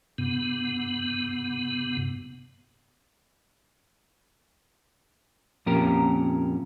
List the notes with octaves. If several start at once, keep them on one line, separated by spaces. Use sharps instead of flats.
G2 C3 B3
F2 A#2 C#4 G4 A#4 A#5